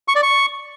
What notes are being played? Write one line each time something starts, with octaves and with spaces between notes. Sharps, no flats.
C#6
D5
C#6